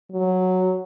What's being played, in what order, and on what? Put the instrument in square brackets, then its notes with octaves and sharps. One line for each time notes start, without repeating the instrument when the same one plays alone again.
[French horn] F#3